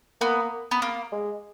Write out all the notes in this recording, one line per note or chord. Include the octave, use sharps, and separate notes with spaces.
A#3 B3
B3
A#3
G#3